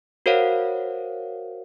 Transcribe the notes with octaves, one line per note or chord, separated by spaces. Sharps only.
F#4 A#4 C5 C#5 F5 F#5